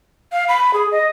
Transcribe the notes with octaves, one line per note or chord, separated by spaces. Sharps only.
F5
B5
G#4
D#5